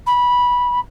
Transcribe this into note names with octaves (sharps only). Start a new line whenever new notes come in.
B5